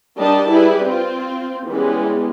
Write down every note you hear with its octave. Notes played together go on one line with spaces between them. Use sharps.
G3 D4 A#4 D#5 A5
G3 E4 G#4 B4
C4 F4
E3 G3 G#3 B3 C#4